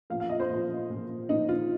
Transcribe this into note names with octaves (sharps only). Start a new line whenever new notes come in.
A#2 F3 F5
F5
D#5
C5
A#2 F3
A#2 F3
A#2 F3 D#4
F4